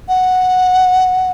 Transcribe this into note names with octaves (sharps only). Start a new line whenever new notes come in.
F#5